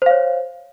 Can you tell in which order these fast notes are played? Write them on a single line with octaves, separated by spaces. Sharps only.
C5 F5 C#5